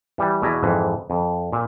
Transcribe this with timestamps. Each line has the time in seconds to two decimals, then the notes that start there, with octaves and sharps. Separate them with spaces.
0.18 E3 G3
0.42 E2 B2 E4 D5 G#5 A#5
0.63 F2 G#2 E3
1.10 F2
1.52 A#2